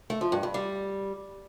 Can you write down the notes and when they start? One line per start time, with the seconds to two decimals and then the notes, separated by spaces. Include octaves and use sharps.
0.10 A3
0.21 F3
0.32 G2
0.43 G2
0.54 G3